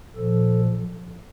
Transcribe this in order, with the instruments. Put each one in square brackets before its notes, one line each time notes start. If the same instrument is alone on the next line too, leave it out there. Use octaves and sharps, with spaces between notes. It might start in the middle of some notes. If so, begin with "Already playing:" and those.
[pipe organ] A#2 F3 A4